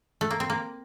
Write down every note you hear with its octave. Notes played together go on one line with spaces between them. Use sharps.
A3
A#3
C4
A#3